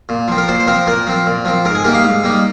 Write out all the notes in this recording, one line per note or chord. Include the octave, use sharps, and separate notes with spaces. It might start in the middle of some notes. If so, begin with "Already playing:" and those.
A#2
F3 C4
A#4
A#2 C5
C5
F3 C4 A#4
A#2 A#4
F3 C4
A#2
F3 C4
G#2 A#4
G#4
G3 A#3 D#4 A#4
F5
G#2
G3 A#3 D#4